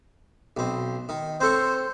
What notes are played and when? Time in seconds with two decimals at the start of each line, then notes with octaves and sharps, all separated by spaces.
0.57 B1 C4
1.09 D#3
1.41 C4 A4 C5 C#5